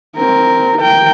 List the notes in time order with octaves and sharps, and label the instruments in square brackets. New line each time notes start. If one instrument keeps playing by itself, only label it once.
[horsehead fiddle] C4 A#4
A#4 G5